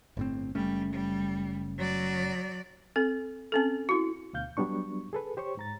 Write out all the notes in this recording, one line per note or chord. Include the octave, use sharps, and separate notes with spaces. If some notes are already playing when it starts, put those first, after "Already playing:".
G1 A2 C4
F#1 G3 A3 C#4
G3
F#3 D5
C4 A4
C4 C#4 A4
E4 F#4
D2 B2 F5 G6
F#3 G3 B3 D4 C#6
G#4 A4 B4
G4 C5 C#5 C#6
G#2 A#5 A6